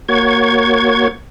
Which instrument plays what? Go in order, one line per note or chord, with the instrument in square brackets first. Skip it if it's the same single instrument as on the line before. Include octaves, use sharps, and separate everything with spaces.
[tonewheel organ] A#3 F#4 C#5 G#6